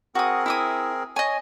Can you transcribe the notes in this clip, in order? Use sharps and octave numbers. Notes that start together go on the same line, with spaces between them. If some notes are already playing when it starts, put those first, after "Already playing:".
C4 F#4 G#4 A#4 D#6
E4 E5 D#6
C#5 D#5 G#5